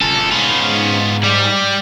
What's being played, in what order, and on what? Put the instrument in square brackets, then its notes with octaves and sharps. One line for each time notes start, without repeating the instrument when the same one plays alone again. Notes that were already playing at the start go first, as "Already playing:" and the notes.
[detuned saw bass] D1 [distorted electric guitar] C#4 F4 [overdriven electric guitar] A4
[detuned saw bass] G#2 [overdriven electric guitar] B3 F4 [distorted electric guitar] C#4 B5
[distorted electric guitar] G3 [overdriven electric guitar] G4 D5